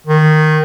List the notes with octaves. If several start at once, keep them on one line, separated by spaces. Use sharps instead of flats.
D#3